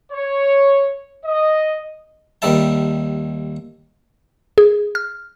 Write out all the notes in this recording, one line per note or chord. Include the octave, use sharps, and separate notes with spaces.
C#5
D#5
D#2 D#3 G3 E5 A5
G#4
F6